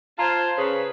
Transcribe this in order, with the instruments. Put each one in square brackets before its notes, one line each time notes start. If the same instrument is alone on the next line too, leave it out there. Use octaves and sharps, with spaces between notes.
[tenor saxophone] F4 [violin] C5 A5 [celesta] A#5 F6 G#6
[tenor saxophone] C#3 [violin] B4 [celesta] C5